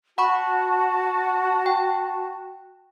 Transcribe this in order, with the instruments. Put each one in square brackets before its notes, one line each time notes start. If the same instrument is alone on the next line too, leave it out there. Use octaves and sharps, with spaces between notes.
[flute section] F#4 A5 [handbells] F#5 B5 C#6
[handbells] G5